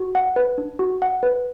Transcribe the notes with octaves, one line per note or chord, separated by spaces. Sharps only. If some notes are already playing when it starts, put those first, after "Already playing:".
Already playing: F#4
F#5
B4
D4
F#4
F#5
B4